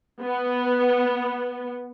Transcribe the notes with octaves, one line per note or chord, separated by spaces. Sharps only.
B3